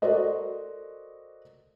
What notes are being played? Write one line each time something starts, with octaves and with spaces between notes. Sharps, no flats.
F#4 A4 A#4 C5 D5 D#5